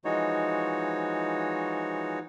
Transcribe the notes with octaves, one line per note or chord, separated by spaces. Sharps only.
E3 F3 G#3 D#4 F#4 C#5